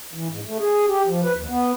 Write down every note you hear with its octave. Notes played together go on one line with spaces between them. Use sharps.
E3
G#2
A3
G#4
G4
F3
B4
D#2
B3